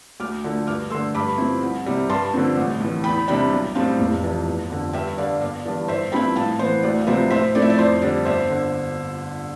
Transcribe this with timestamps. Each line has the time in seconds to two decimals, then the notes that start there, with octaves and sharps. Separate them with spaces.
0.20 D2 D6 F6
0.44 D3 F3 A3
0.67 G2 D6 F6
0.90 A3 C6 E6
0.95 D3
1.15 G2 B5 D6
1.38 F3 C4 E4
1.62 C2
1.86 C3 G3
2.09 G2 A5 C6
2.34 D3 F3 C4
2.57 A1
2.80 A2 E3
3.04 E2 G5 B5
3.28 C3 G3 D4 G5 B5
3.52 B1
3.75 A2 G3 C4 F5 A5
4.00 F1
4.24 F2 E3
4.47 G1
4.70 F2 D3 F3
4.93 G2 E5 G5
5.17 D3 G3 D5 F5
5.41 G1 D5 F5
5.65 G2 E3 D5
5.88 G1 C5 E5
6.12 G2 F3 C4 E4 G5 B5
6.36 A2 F5 A5
6.59 E3 B3 C5
6.83 D2 D5
7.01 F5
7.07 C3 F3 B3 F4 C5 E5
7.30 A2 C5 E5
7.55 F3 A3 C4 E4 D5
7.62 E5
7.70 D5
7.78 F2 C5
8.02 D3 G3 D4 D5
8.25 G1 C5 E5
8.50 D3